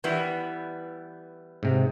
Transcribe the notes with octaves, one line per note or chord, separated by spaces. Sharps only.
E3 G3 B3
G#2 C3